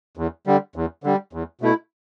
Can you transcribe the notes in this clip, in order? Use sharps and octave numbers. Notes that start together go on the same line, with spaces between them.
E2
D3 G3
E2
D3 G3
E2
B2 A3 E4